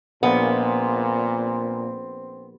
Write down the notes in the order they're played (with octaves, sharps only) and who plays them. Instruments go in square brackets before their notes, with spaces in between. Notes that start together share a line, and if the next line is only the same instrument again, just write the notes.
[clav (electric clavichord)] A#1 [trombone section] A#2 [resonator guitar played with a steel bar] B3 [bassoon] C4